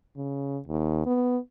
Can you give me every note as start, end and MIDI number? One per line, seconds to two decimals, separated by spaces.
0.16 0.59 49
0.67 1.04 39
1.06 1.38 59